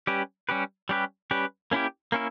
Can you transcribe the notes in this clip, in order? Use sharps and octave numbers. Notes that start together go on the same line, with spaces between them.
G3 C#4 G4 B4
G3 C#4 G4 B4
G3 C#4 G4 B4
G3 C#4 G4 B4
A#3 C#4 E4 G4
A#3 C#4 E4